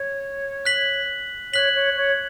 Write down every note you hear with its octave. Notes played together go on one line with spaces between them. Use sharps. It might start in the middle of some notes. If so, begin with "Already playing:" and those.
Already playing: C#5
F#6 B6 F#7
C#5 F#6 B6 F#7
C#5
C#5